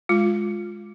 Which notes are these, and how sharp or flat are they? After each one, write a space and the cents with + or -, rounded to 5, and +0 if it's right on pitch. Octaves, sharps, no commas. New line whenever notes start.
G#3 +0 F4 +10